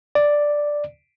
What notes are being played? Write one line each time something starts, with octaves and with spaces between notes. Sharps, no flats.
D5